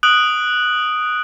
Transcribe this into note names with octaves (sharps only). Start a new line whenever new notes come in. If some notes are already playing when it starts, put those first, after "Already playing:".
D#6 F#6 D7 F#7